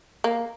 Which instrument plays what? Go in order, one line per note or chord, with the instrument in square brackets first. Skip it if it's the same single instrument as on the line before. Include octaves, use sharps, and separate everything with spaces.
[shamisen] A#3